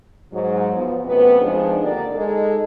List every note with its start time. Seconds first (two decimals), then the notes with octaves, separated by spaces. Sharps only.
0.32 G#2 F#3
0.74 F3 B3
1.05 F#2 C3 A3 B3 B4
1.41 F2 F3 G#3 D4 D#4 G#4
1.82 D#2 D3 A#3 G4 A#4 D5
2.14 G#3 D#4 G#4 A4